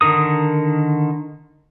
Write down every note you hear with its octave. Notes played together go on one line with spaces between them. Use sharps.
D3 D#3 A#4 D#6